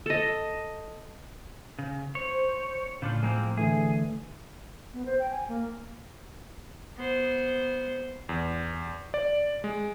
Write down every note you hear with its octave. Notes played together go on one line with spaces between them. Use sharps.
A4 D#5
C#3
C5 C#5
A2 C#3 D4 F4
F3 G#3 A#3 C4
D3 E3 A3 G#4
B3
C5
G5
G#5
A#3
B3 C5
E2
D5
G#3